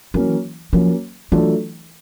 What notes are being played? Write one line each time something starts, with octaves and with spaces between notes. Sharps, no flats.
E3 F#3 A#3 C#4
F3 F#3 A#3 C#4
E3 F#3 A3 D4 F4 A4